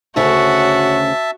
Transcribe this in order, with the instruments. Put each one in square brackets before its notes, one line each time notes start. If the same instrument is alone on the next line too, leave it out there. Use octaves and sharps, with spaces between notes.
[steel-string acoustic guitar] D2 C#3 C#5 [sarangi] F#4 [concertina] E5 A5